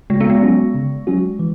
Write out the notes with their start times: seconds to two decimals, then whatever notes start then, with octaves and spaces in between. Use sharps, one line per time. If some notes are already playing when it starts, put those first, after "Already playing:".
0.10 C#3 G#3
0.20 B3
0.30 G#3
0.43 F#3 C#4 F#4
0.74 C#3
1.07 F#3 C#4 F#4
1.39 E3